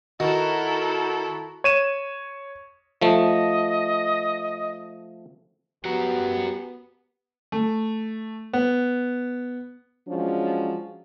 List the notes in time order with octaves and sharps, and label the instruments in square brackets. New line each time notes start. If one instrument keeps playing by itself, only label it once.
[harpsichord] D#3 [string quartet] E4 A4 A#4 [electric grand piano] F#4
[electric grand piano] C#5 D#7 E7
[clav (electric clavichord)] F3 A3 [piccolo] D#5
[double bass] B3 [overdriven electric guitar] F#4 A#4 [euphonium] G4
[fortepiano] A3
B3
[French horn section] F3 F#3 G#3 C#4 D4